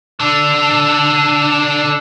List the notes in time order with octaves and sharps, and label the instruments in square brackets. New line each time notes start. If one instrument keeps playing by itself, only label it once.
[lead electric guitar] D3 D4